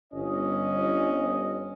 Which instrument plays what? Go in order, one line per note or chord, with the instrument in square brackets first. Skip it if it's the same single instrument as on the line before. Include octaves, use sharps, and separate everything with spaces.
[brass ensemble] G1 D#5 [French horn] C#4